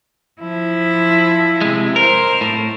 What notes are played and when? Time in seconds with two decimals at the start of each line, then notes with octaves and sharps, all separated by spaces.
0.40 F3 E4
1.61 C3 G#3
1.96 A#4 C5
2.41 A2